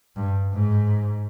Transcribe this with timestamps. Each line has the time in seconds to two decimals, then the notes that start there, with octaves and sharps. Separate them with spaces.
0.16 G2
0.53 G#2